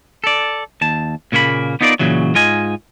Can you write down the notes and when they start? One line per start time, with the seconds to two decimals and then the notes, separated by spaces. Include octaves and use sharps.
0.24 A4 D5
0.81 D#2 A5
1.32 A#2 C#3 A#3 C5 B5
1.81 B3 D#4 F4 A#4 C#5 D5
1.99 A#2 C#3 E3 F#3
2.35 G#2 F4 D#5 G#5